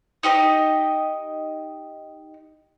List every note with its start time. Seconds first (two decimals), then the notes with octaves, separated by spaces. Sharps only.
0.23 D#4 G4 D5 D#5